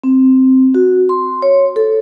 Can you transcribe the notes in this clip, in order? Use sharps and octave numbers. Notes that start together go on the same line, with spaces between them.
C4
F#4
C6
C#5
A4